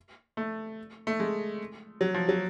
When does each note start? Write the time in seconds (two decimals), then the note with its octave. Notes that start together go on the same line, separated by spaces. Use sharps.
0.37 A3
1.07 A3
1.20 G#3
2.01 F#3
2.14 F3
2.29 F#3